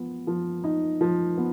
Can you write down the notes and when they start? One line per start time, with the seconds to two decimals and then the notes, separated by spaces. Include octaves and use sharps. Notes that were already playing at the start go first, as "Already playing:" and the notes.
Already playing: F3 B3
0.27 F3
0.64 D#4
1.01 F3
1.38 B3